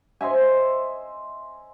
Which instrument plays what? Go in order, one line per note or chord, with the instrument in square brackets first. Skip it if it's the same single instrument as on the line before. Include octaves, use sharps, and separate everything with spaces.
[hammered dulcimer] C5 D#5 E5 G#5